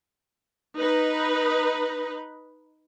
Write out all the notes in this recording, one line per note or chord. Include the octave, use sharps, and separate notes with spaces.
D#4 B4